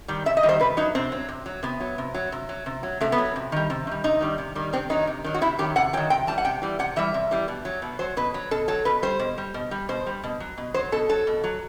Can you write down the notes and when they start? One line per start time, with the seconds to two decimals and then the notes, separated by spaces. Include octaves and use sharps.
0.08 D#3 G3
0.26 C3 E5
0.37 D#5
0.43 D#3 G3
0.49 C5
0.60 C3 B4
0.77 F#3 D#4
0.95 C3 C4
1.12 F#3
1.28 C3
1.46 F#3
1.63 C3 B3
1.80 F#3
1.98 C3
2.14 F#3
2.32 C3
2.49 F#3
2.66 C3
2.83 F#3
3.01 C3 A3
3.12 B3
3.18 F#3
3.36 C3
3.52 D#3 G3
3.70 C3
3.87 D#3 G3
4.04 C3 D#4
4.21 D#3 G3
4.38 C3
4.55 D#3 G3
4.73 C3 C4
4.90 D#3 F#3 D#4
5.07 C3
5.24 D#3 F#3
5.34 F#4
5.41 C3 E4
5.59 D#3 F#3 G4
5.76 C3 F#5
5.93 F#3 G5
5.97 D#3
6.10 C3 G5
6.27 E3 G3 A5
6.38 F#5
6.45 C3 G5
6.62 E3 G3
6.79 C3 F#5
6.96 E3 G3 E5
7.14 C3
7.31 E3 G3
7.48 B2
7.65 F#3
7.82 B2
7.99 F#3 C5
8.17 B2 B4
8.34 F#3
8.51 B2 A4
8.68 F#3 A4
8.85 B2 B4
9.02 G3 C5
9.19 B2
9.38 G3
9.54 B2
9.71 G3
9.89 B2 C5
10.06 G3
10.23 B2
10.40 F#3
10.58 B2
10.74 F#3 C5
10.92 B2 A4
11.09 F#3 A4
11.27 B2
11.44 F#3